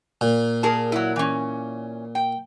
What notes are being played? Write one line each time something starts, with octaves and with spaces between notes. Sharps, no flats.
A#2
G#4 A#4 A5
F#3 E4
E3 C#4
G5